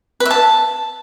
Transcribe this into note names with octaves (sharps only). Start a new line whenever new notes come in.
B4
E5
A5